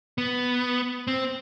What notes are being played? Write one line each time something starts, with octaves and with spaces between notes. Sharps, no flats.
B3
C4